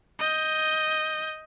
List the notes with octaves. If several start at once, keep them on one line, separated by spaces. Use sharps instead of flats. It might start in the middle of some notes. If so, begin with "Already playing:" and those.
D#5 G6